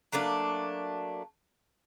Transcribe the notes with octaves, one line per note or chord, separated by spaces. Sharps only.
F#3 A3 A#3 D4